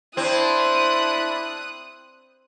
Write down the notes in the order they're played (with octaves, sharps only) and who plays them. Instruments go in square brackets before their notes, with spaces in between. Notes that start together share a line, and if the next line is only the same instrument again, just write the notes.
[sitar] C4 [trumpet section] D4 E4 [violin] D#6 F#6